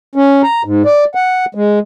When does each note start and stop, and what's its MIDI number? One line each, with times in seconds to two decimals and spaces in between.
0.15 0.42 61
0.43 0.62 82
0.65 0.82 44
0.86 1.04 74
1.15 1.45 78
1.55 1.79 56